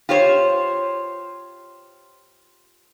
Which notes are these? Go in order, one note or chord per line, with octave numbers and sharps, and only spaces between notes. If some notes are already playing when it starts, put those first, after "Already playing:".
F4 G4 C5 C#5